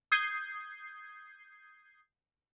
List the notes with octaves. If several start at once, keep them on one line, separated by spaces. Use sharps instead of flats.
D#6 G6 G#6 C7